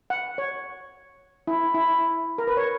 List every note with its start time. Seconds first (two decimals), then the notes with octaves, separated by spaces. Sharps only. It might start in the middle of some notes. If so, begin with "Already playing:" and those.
0.10 F#5
0.38 C#5
1.47 E4
1.75 E4
2.38 A#4
2.47 B4
2.57 C#5